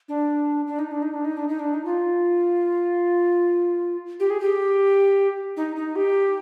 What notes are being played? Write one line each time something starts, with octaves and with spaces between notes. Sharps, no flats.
D4
D4
D#4
D4
D#4
D4
D#4
D4
D#4
D4
D#4
F4
G4
G#4
G4
D#4
D#4
G4